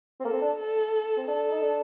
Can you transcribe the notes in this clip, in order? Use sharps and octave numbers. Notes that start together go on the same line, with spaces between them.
C4
A#3 A4
C4
D4
A4
C4
D4 A4
D#4
D4